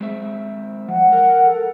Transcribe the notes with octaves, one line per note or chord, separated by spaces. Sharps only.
G#3 C4 E5
F3 F#5
A#4
A4